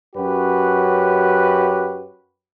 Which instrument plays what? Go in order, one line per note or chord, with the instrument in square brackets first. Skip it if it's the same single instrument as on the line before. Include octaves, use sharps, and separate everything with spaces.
[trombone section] F#2 C#4 F#4 G4 B4